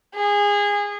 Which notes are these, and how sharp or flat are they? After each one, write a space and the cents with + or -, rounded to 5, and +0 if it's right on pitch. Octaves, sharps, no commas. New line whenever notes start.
G#4 -25